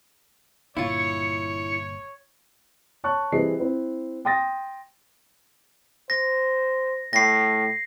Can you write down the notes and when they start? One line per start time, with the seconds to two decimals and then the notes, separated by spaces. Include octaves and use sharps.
0.77 G1 G2 A#2 E4 F4 C#5 C#7
3.04 C#5 A5 C#6 F#6
3.32 E3 G3 C4 G#4 D#5 C7
3.60 C4 E4
4.25 G5 C6 D#6 A6 A#6
6.10 C5 A#6
7.13 A2 A#6 C7